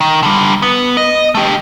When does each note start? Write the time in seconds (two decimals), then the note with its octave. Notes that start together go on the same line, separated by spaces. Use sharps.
0.01 D#3
0.23 D3 G3
0.62 B3
0.97 D#5
1.35 A3 G4